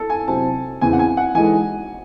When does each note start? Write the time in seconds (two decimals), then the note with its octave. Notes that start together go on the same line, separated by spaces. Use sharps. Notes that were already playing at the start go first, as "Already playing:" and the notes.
Already playing: A4
0.10 G#5
0.28 C3 F#3 C4 E4 C5 A5
0.81 E2 C#3 E3 C4 G#5
0.93 F#5
0.99 G#5
1.17 F#5
1.35 E3 G#3 D#4 A4 G#5